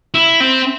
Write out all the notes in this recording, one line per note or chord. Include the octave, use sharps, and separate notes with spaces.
E4
C4